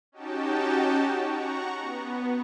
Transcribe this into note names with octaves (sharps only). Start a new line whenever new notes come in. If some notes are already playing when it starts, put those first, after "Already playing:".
C#4 D#4 F#4 G4 G5 A5
F#5 A#5 C#6
B3